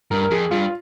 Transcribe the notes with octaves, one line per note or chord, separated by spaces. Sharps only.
G2 A#4
A#4
F2 G#4
G2 F4